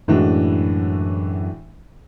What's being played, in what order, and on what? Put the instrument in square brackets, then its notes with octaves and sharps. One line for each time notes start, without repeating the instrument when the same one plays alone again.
[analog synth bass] F#2 [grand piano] A2 E3 G#3 D4 F#4